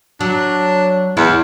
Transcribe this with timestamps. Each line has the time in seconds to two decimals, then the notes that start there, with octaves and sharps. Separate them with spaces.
0.20 F#3 D4
1.17 E2 E4